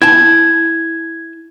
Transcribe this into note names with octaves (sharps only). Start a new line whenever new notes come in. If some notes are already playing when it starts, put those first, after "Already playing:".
E4 G5 A5 G#6